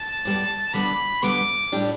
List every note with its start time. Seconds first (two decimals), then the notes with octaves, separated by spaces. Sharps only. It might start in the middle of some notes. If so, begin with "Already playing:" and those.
Already playing: A5
0.25 G2 D3 G3 B3
0.73 D3 G3 B3 D4 B5
1.23 G2 D3 G3 B3 D4 D6
1.72 A2 G3 D4